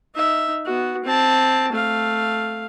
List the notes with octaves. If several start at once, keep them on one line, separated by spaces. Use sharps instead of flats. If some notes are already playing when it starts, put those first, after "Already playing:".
D#4 E5
B3 F#4
C4 A5
A3 F5